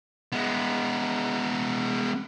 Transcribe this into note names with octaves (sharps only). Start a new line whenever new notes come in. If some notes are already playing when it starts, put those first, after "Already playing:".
G#3 B3